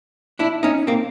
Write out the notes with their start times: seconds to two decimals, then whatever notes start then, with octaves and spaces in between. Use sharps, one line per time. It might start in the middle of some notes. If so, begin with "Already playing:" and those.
0.39 D4 E4
0.63 C#4 D#4
0.87 A#3 C4